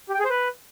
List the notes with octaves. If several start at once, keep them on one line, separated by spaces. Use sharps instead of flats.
G4
G5
G#4
C5
B4